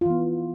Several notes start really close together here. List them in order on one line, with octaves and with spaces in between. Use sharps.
F4 E3 B3